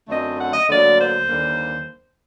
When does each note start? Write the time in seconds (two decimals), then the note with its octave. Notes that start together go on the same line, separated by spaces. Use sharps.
0.09 F#2 D3 A3 C4 D#5
0.39 F#5
0.54 D#5
0.69 D2 D3 F#3 A#3 D5
0.99 C5
1.29 D#2 D3 G3 A#3